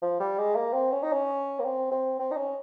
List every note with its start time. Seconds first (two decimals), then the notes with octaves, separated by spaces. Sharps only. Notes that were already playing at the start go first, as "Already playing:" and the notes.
0.02 F3
0.20 G3
0.38 G#3
0.55 A#3
0.74 C4
0.92 C#4
1.03 D#4
1.12 C#4
1.60 A#3
1.65 C4
1.91 C4
2.19 C4
2.31 D#4
2.37 C#4